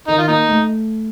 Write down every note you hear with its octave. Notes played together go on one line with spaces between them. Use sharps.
D#3 D#4
F4
A#3 D#4
A3